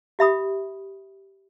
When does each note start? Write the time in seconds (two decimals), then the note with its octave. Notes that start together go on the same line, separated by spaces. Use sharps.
0.19 G4 E5 B5 D#6